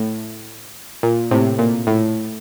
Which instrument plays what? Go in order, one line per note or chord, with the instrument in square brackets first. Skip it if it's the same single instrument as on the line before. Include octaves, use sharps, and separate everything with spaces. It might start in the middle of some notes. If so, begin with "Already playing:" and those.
Already playing: [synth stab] A2
A#2
A2 C3
A#2
A2